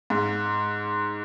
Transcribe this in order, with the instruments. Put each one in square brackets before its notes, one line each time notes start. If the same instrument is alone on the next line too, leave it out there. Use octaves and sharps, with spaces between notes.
[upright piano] G#2